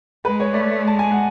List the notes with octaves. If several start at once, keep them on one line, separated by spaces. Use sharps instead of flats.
G#3 B4
C#5
A3 D5
G#3 A5
G#5
F#5